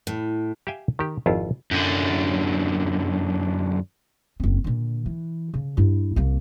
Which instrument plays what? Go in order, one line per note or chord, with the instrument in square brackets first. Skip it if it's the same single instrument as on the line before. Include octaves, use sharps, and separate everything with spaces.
[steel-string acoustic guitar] A2
[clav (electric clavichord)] G4 E5 F5 G5 G#5
D#3 G4
G#1 F2 E4 F4
[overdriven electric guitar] F#2 D3
[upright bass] F#1 C4
A#2 D3
E3
C#3
G2 E4
C2 A#3